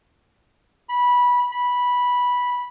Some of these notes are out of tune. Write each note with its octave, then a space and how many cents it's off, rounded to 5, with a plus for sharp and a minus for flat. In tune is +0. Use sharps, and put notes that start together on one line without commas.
B5 -15
B5 -10